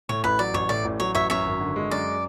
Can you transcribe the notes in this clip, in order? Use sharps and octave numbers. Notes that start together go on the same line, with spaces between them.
A2 C#5
A1 B4
F#3 D5
A1 C#5
A2 D5
A1
F#3 C#5
A1 C#5 E5
F#2 C#5 E5
G#1
D3
G#3
F#2 D5